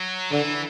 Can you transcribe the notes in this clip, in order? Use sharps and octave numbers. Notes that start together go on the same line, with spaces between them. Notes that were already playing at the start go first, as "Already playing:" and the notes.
Already playing: F#3
D3 E3